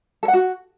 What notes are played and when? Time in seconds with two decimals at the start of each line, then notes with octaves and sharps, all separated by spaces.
0.23 A4
0.28 F#5
0.33 F#4